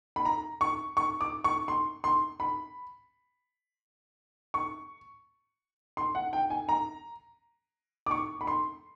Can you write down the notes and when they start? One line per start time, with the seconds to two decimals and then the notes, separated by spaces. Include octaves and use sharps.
0.16 B5
0.25 A#5
0.61 C#6
0.97 C#6
1.21 D6
1.44 C#6
1.68 C6
2.04 C6
2.40 B5
4.54 C#6
5.97 C6
6.15 F#5
6.33 G5
6.50 G#5
6.69 A#5
8.06 D6
8.11 C#6
8.41 B5
8.47 C6